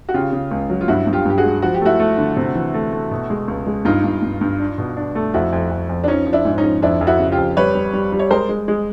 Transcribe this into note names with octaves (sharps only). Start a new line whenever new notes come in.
F#4
C#3 F4 G4
C#3
C#2
F#3
F4
G2 E4 F#4
G2
F4 G4
G2 G4
F#4 G#4
G#3
F3 F#4
G4
A3 E4 F#4
A3
D3
C3
E3
A3
A3
B2
G#3
C#2
G#3
G2 D#4 F4
G2
G2
G2
D4
B2
D4
A3
F2 E4 F#4
F2
F2
F2
D4
F3 C#4 D#4
F3
D4 E4
G#2
C#4 D#4
F3
F2 D4 E4
F2
E4 F#4
C#3
F4 G4
F2
G3 B4 C#5
G3
G3
G3
C#5
G#3 A#4 C5
G#3
G#3